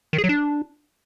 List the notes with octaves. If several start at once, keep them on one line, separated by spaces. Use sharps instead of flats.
D#3
G#4
F#3
D4